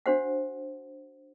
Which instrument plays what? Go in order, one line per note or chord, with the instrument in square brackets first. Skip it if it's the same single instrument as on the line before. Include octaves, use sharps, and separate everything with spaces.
[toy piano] D4 F#4 C5 F#5